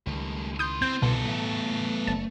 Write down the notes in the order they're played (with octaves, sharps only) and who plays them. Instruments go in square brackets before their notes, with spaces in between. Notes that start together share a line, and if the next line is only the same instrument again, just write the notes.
[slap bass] C#2 D#3 [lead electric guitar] G3 A3
[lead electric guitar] E4 C6 [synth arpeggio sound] D#6 G6
[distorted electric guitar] C4 [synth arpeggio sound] G6
[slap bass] C2 D3 [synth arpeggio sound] B2 [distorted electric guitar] B3 A4
[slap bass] A2 E3 [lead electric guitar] A3
[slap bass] F#1 [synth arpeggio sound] A5